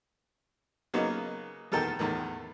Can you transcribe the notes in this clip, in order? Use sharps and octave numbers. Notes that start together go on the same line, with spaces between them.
C#3 F#3 A#3 B3 D#4
E2 B2 D#3 A4 A#4 G5
E2 A2 D#3